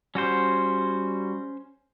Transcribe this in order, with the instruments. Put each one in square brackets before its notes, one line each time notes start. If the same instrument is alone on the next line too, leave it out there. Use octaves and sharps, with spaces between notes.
[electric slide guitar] G3 F#4 [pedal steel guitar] C#4 C5